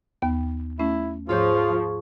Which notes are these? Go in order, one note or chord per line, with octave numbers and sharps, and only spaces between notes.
D#2 B3 G5
A3 C#4 E4
G#2 F3 F4 G#4 C#5 C#6 G6